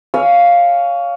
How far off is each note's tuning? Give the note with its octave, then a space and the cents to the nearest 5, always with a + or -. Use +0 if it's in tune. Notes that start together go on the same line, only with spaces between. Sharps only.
C#5 +25 F5 +0 G#5 +10